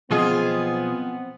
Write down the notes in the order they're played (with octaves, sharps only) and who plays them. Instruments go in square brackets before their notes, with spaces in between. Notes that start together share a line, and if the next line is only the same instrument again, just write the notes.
[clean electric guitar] B1 F3 D#5 [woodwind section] B3 [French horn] C4 [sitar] F4 G#4